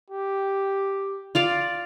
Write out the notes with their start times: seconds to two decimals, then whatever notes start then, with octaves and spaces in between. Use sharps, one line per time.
0.10 G4
1.35 F4 D5 F5